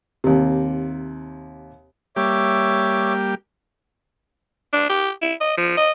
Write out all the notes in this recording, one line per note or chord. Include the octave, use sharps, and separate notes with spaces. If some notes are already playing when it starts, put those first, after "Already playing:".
D#2 C3
G3 A#3 G4 C#5 E5 D6
D4
G4
E4
D#5
F3
D#5